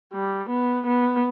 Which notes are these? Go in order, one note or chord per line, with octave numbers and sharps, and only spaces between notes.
G3
B3
B3